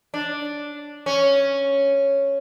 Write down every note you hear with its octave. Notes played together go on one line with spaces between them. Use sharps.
D4
C#4